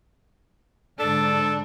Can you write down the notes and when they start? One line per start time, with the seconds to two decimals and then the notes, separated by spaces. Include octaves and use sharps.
0.99 G#2 D3 D4 A4